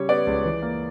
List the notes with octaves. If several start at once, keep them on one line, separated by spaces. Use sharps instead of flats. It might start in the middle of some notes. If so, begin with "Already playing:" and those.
Already playing: C#3 G3 C#5
B3 D5
C#2
E3
A#3